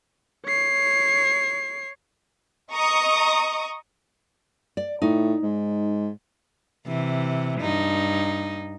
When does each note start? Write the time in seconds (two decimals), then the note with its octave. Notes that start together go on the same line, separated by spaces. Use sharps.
0.46 C#5 C7
2.72 D#5 A#5 C#6 D#6
4.77 D5
5.02 A2 D#4
5.43 G#2
6.87 C3 E3
7.60 G2 D#4